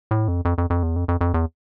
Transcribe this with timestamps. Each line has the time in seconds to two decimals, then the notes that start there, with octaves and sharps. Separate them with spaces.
0.11 A2
0.28 F2
0.45 F2
0.58 F2
0.70 F2
0.83 E2
0.96 F2
1.08 F2
1.21 F2
1.34 E2